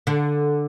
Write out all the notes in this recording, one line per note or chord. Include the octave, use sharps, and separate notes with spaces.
D3